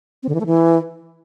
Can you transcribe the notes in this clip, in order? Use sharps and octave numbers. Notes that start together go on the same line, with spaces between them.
C4
D3
E3
A3
E3